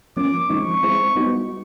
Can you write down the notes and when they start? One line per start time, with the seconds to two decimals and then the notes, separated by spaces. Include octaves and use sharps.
0.17 F3 A#3 C#4 D6
0.50 F3 G#3 C4 D#4 C#6
0.83 G#3 C4 E4 G#4 C5
1.16 G3 B3 D#4 F#4